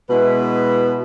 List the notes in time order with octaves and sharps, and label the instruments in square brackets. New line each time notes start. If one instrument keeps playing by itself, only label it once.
[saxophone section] B2 G#3 E4 B4